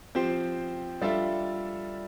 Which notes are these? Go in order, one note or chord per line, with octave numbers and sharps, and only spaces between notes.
F3 C4 G4 C5
G3 D4 F4 A4 E5